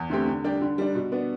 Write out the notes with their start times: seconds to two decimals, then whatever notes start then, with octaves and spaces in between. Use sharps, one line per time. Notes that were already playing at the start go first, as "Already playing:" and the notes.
Already playing: E2
0.10 D3 A3 C4 G4
0.27 D3
0.44 G3 D4 G4
0.61 D3
0.78 G3 D4
0.95 B2
1.12 B3 D4